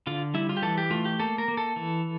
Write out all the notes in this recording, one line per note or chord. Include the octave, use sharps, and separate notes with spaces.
D3 F4
G3 E4
F4
G4
E3 A4
G4
A3 F4
G4
A#3 A4
A#4
A#3
A4
E3